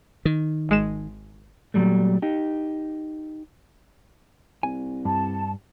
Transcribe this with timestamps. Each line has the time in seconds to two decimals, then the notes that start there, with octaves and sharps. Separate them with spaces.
0.25 D#3
0.69 G#1 G#3 E7
1.74 A#2 E3 F#3 G3 A3
2.22 D#4 G4
4.63 C2 G#5
5.05 G2 A5